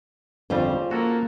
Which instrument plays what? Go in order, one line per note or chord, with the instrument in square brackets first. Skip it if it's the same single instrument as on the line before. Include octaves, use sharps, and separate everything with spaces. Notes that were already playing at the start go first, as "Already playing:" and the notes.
[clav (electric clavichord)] G1 F2 G3 [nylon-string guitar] C#3 F4 C5
[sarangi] A#3 [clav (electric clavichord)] F#4 A4 A#4